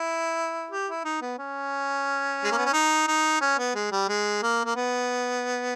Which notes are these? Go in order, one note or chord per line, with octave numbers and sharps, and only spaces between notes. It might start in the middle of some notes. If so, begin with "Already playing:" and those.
Already playing: E4
G4
E4
D#4
B3
C#4
G#3
A#3
B3
C#4
D#4
D#4
C#4
B3
G#3
G3
G#3
A#3
A#3
B3